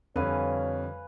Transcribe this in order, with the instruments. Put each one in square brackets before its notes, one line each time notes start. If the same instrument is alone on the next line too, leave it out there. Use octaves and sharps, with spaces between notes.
[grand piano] F2 G3 [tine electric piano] D3 [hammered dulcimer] B4 F5 G#5 [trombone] C#5